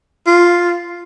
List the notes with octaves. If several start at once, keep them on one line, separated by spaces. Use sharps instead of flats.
F4